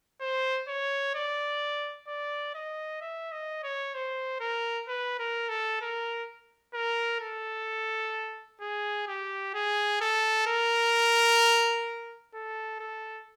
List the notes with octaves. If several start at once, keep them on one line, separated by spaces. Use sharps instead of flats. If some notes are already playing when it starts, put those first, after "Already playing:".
C5
C#5
D5
D5
D#5
E5
D#5
C#5
C5
A#4
B4
A#4
A4
A#4
A#4
A4
G#4
G4
G#4
A4
A#4
A4
A4